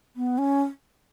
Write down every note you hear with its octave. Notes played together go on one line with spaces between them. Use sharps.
B3
C#4